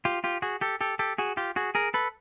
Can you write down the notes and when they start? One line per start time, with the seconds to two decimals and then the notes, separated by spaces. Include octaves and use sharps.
0.05 F4 G4
0.24 F4 G4
0.42 F#4 G#4
0.61 G4 A4
0.81 G4 A4
0.99 G4 A4
1.18 F#4 G#4
1.37 F4 G4
1.56 F#4 G#4
1.75 G#4 A#4
1.94 A4 B4